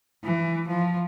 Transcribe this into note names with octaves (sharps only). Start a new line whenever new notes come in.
E3
F3